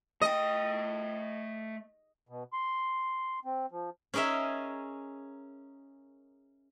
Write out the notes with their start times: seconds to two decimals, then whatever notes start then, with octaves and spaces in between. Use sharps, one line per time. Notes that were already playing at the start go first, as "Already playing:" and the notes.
0.22 A3 D#5 G5
2.29 B2
2.53 C6
3.45 C4
3.71 F3
4.14 C#4 G#4 A#4 D#5 E5